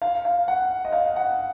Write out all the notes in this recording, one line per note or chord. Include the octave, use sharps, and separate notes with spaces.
F5
F5
F#5
D#5
F5
F#5